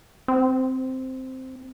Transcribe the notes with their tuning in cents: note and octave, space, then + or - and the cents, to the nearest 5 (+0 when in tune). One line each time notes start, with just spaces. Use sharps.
C4 -5